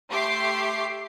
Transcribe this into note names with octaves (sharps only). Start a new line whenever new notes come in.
A3 G4 E5 C6 D6 C7